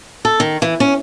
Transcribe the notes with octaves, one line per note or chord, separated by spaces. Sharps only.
A4
D#3
E3
C#4